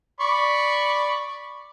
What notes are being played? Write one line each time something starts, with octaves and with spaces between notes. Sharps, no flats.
D5 B5 C#6